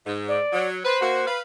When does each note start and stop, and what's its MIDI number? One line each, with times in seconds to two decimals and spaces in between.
0.06 0.38 44
0.28 0.68 74
0.52 0.79 54
0.85 0.97 71
0.85 1.28 72
1.01 1.25 58
1.01 1.25 66
1.27 1.41 71
1.27 1.41 77